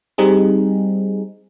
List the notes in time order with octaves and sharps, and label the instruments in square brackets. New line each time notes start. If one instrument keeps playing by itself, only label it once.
[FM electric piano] G3 C4 D#4 G#4